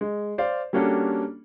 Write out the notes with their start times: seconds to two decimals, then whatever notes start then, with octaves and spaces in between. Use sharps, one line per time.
0.01 G#3
0.38 C5 D5 F5
0.73 G3 A#3 C#4 D4 F#4 A4